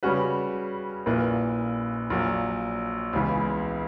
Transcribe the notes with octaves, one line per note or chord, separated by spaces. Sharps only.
C#3 G3 C#4 F#4 B4
A#1 A#2 A#3 E4 B4
A#1 A#2 F#3
C#2 C#3 E3 B3